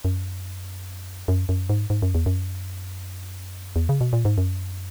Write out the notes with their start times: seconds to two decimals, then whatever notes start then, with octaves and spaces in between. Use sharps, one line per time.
0.05 F#2
1.28 F#2
1.49 F#2
1.70 G#2
1.90 G#2
2.02 F#2
2.15 E2
2.26 F#2
3.76 E2
3.89 C#3
4.01 B2
4.13 A#2
4.25 G#2
4.38 F#2